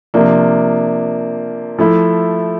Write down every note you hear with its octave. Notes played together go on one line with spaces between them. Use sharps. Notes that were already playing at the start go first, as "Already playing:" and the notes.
C3 F3 A#3 D4
F3 A3 E4